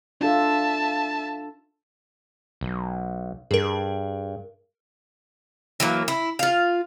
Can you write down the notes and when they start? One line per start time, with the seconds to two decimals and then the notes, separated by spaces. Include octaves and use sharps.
0.21 D4 F4 A4 E5 A5
2.61 B1
3.51 G2 G#4 A#4
5.80 E3 F#3 A#3
6.08 E4
6.39 F4 F5